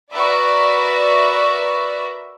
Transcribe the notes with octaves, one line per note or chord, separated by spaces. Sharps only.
F#4 A#4 B4 D5 E5